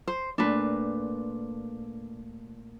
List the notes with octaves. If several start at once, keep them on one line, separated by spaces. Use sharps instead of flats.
C5
A#2 A3 D4 B4